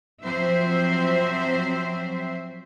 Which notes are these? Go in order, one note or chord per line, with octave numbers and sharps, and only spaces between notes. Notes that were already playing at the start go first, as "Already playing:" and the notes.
F3 F#3 C4 C5 E5